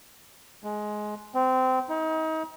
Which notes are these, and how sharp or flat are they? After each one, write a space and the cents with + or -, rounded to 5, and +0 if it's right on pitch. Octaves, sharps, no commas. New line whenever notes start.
G#3 +15
C4 -20
D#4 +35